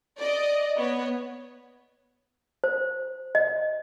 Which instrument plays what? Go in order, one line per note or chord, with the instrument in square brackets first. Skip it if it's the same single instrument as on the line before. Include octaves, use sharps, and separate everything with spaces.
[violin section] D5 D#5
B3 C#5
[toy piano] C5
D#5